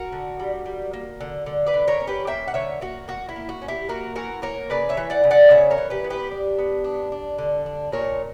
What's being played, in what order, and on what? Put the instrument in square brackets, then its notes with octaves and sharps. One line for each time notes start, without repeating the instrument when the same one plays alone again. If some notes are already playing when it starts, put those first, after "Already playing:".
Already playing: [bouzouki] F#4 A#4
D3
G3
G3
A#3
D3
D3
B4 D5
D3
A#4 C#5
C#4
G4 B4
A#3 E5 G5
F#5
D3 C#5 E5
A#3 F#4
A#3 F#4
E4
A#3
F#4
C#4
E4 G4
A#3 F#4 A#4
E3 F#4 A#4
A#3 A#4 C#5
C#3 B4 D5
C#5 E5
E3
D5 F#5
C#3
D5 F#5
C#3 C#5 E5
A#4 C#5
E3
G4 B4
B3
G4 B4
D4
B3
D4
D4
D3
D4
A#2 A#4 C#5